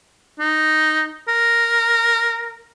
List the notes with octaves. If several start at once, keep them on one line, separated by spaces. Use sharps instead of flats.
D#4
A#4